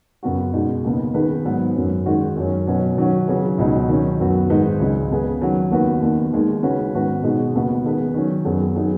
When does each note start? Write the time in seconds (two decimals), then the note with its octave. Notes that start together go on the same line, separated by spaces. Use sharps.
0.23 F#2 C#3 B3 F#4
0.53 B2 G#3 D#4
0.84 D#2 C#3 B3
1.14 D#3 B3 D#4 G#4 B4
1.45 G#2 F#3 B3
1.76 F#2 F#3 C#4
2.06 D#3 G#3 D#4 F#4
2.36 F#2 F#3 C#4
2.67 B2 F#3 C#4 B4
2.97 D#3 F#3 C#4 F#4
3.27 C#3 F#3 C#4 G#4 B4
3.58 C#2 B2 F#3 D#4
3.89 D#3 F#3 C#4
4.19 F#2 F#3 B3 F#4
4.49 G#2 D#3 G#3 D#4 B4
4.80 C#2 C#3 G#3
5.10 C#3 B3 G#4 B4
5.41 D#3 F#3 C#4 F#4
5.71 D#2 D#3 B3 F#4 B4
6.01 D#2 D#3 B3
6.33 D#2 D#3 G#3 D#4
6.62 C#3 G#3 C#4 F#4 B4
6.92 G#2 D#3 B3 F#4 B4
7.23 B2 G#3 D#4 G#4
7.54 D#2 C#3 B3 F#4
7.85 D#3 B3 G#4 B4
8.14 D#3 F#3 C#4
8.45 F#2 F#3 B3 G#4
8.75 F#3 B3 D#4 G#4